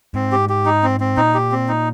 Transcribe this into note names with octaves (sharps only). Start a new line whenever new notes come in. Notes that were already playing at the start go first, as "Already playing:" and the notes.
G#2 C4
G4
G4
D#4
C4
C4
A#2 D#4
G4
C4
D#4